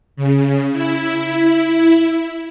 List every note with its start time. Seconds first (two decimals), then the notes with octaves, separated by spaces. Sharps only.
0.16 C#3
0.73 E4